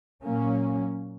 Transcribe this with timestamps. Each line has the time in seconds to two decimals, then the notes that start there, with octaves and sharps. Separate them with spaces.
0.23 A#2 F#3 A#3 C#4